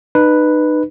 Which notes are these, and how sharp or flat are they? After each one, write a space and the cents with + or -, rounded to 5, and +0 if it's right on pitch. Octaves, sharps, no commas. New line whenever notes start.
D#4 -35 B4 +0